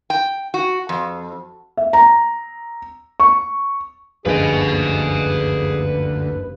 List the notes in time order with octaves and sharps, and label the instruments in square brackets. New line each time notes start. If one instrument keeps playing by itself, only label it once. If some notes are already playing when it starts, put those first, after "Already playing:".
[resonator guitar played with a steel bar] G5
F#4
F2
[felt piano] E5
A#5
C#6
[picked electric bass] F#1 G2 F3 [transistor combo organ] D2 [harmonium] G#4 [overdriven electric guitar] B4 D#5